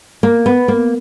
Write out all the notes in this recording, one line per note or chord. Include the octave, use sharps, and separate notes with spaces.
A#3
B3
A#3